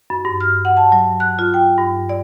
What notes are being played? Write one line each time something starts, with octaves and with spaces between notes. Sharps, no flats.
F#2
G2
F6
F#5
A5
F#3
F#6
F4
G5
G2
D5